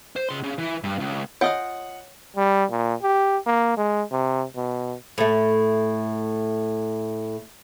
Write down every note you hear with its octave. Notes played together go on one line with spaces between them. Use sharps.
C5
C#3 C6
C#3
E3
G2
C#2
F4 C#5 D#5 F5 F#5 G#5
G3
A#2
G4
A#3
G#3
C3
B2
A2 A3